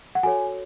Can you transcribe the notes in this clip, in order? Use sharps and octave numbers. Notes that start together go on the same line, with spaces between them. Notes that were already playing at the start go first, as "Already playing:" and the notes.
F#5
F#4 A4 C#5 G#5